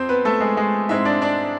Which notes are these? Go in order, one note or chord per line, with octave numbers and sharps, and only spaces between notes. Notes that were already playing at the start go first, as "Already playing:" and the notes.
Already playing: F2 C4 C5
B3 B4
A3 A4
G#3 G#4
G#3 G#4
G#2 G#3 C4 E4 E5
D4 D5
D4 D5